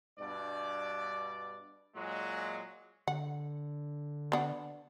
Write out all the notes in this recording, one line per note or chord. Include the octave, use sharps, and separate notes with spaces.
G2 B2 D5
A#2 F#3 G#3
D3 F#5
B3 D4 F#5